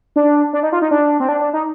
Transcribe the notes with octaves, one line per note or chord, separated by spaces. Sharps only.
D4
D4
D#4
F4
D#4
D4
C4
D4
D4
D#4